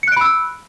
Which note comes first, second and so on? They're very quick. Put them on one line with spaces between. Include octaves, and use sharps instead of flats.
C#7 F#6 D7 B5 E6